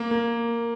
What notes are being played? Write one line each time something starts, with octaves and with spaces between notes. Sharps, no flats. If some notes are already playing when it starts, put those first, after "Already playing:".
Already playing: A#3
A#3